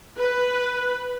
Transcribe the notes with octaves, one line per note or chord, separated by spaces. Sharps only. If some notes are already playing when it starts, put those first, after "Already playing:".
B4